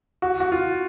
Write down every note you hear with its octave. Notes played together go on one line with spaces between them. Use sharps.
F#4
F#4
F4